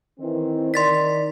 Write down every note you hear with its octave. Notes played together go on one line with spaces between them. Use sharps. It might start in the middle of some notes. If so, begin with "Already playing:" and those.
D#3 E3 C4
D#3 D5 C6 A6 B6